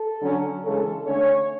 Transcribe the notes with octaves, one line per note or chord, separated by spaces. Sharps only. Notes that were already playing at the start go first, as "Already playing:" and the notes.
Already playing: A4
D3 F#3 C#4
C#3 E3 G#3 C#4 A4
D3 A3 C#4 C#5